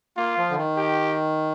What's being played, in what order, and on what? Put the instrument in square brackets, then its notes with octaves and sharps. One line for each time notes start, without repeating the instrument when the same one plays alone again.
[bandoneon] A#3 [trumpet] F4
[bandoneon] F3
D3
D#3
[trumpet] G4